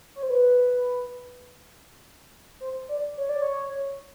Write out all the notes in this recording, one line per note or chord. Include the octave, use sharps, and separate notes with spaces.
C#5
C5
B4
C5
D5
C#5
D5
C#5